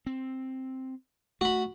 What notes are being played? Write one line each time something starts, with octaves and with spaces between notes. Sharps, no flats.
C4
A3 F#4 B5